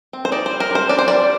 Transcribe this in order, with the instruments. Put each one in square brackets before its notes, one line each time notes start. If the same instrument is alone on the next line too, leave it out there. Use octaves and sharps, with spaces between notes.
[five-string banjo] C4
C5
D#4 D5
C5
G3
A#4
G3 C5
D4 D5
C5
G3 D5